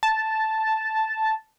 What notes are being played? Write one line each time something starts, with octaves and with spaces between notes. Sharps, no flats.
A5